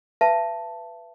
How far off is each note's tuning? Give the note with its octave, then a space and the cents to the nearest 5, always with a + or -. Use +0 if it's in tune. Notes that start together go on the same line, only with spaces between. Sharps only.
B4 +5 E5 +35 A5 +0